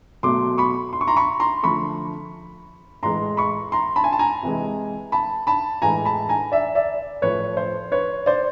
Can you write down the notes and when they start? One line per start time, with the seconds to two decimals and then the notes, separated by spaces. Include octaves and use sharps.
0.23 B2 F#3 A3 C6 D6
0.58 B5 C#6
0.93 C6
1.01 C#6
1.07 A#5 C6
1.16 B5 C#6
1.40 A#5 C6
1.63 D3 F3 A3 B5 C#6
3.03 A2 E3 G#3 A#5 C6
3.37 B5 C#6
3.72 A#5 C6
3.96 A5 B5
4.04 G#5
4.12 A5
4.19 G#5 A#5
4.43 C3 E3 G#3
5.12 A5 B5
5.47 A5 B5
5.82 A2 E3 G#3 G#5 A#5
6.05 A5 B5
6.29 G#5 A#5
6.52 D5 E5
6.75 D5 E5
7.21 A2 F3 A3 B4 C#5
7.57 C5
7.92 B4 C#5
8.26 C5 D5